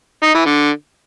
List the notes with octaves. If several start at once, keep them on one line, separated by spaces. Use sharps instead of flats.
D#4
E3
D3